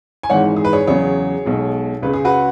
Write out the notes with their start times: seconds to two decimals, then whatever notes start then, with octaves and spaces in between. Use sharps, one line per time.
0.23 G#5
0.30 G#1 G#2 E3 G#3 C#5 F#5
0.56 G#4
0.65 B4
0.73 G#4 C#5
0.87 E2 C#3 F#3 G#4 C#5
1.45 B1 B2 G#3
2.02 C#2 C#3 G#3 B4
2.13 G#4
2.25 F#4 B4